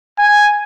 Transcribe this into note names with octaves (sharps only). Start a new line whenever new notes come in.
G#5